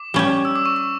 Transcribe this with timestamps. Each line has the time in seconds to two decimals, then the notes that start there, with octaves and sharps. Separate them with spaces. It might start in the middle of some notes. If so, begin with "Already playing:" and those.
Already playing: D6
0.14 G3 C#4 G4
0.45 E6
0.56 D6
0.66 C#6
0.76 D6